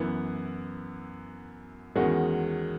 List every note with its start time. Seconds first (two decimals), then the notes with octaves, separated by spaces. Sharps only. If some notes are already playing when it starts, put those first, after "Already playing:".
Already playing: F#2 E3 B3 E4
1.96 E2 D#3 G#3 C#4 F#4